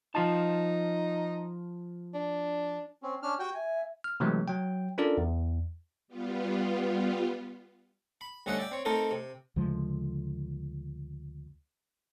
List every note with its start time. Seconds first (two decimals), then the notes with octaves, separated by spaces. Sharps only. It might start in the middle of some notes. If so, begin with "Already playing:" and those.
0.15 F3 D#4 F4 A5
2.14 D4
3.03 C4 C#4
3.23 C#4 D4 F6
3.39 F#4 G4 G5
3.54 E5 G#5
4.04 F6
4.20 C3 E3 F#3 G#3 A3
4.48 F#3 G5
4.98 C#4 D4 F4 A4 A#4 D5
5.18 E2
6.08 G3 B3 F4
8.21 B5
8.46 D2 G3 C#4 D#5 E5 F#5
8.58 D5 E5 G5
8.71 C4 C#5
8.85 A3 C4 D#4 A4 A#4 C5
9.11 C3
9.56 D2 C#3 F3 G#3